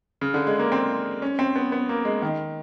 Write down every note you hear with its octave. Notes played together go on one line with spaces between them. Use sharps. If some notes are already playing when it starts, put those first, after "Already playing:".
C#3
D3
G#3
A#3
C4
C#4
C4
B3
B3
A#3
G#3
D#3